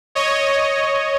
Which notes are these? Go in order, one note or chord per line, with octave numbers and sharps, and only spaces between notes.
C#5 D#5